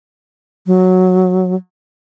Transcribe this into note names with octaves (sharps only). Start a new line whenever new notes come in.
F#3